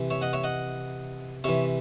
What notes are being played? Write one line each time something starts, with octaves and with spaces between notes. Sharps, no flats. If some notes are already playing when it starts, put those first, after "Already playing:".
Already playing: C3 E3
C#5 E5
D#5 F#5
C#5 E5
D#5 F#5
C3 E3 C#5 E5